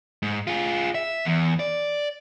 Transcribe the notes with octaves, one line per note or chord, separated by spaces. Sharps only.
G#2
F4 G#4
E5
E2
D5